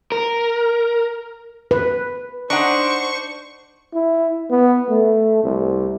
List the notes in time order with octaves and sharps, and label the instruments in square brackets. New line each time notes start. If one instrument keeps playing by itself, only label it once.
[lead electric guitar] A#4
[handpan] B4
[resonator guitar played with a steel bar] D4 D#4 F#5 [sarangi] C5 [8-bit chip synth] C#6
[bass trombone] E4
B3
A3
C2